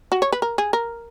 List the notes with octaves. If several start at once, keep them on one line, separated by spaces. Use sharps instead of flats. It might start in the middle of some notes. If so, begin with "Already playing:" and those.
F#4
C#5
B4
A#4
G#4
A#4